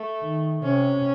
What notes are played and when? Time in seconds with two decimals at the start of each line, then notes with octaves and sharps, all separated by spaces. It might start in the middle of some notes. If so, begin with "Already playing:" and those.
Already playing: A3
0.22 D#3
0.63 C3 C#4